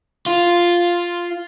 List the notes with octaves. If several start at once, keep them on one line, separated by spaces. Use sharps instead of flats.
F4